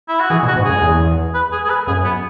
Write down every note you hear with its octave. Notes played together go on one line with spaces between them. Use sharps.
E4
F#4
E3 G#4
B2
F#4
G#2
F#2 G#4
E2
B4
G#4
G#4
B4
F#2 G#4
B3